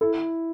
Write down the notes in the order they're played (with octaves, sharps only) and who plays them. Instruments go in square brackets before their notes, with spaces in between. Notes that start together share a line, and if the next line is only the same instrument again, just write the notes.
[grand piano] E4 [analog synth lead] A4